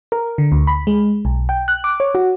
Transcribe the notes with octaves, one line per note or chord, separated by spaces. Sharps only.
A#4
D3
D2
B5
G#3
B1
G5
F#6
D6
C#5
F#4